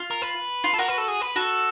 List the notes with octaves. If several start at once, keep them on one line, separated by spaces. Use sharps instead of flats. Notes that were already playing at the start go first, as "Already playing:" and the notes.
Already playing: F4
A#4
B4
F4
A4
F#4 A#4
B4
A4
G#4
B4
F#4 A4